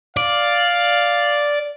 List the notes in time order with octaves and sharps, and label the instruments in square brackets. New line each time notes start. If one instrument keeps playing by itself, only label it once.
[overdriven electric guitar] D5 [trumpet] F5